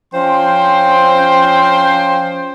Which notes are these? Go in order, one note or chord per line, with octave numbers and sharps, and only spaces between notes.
F3 C#4 C5 G5 C6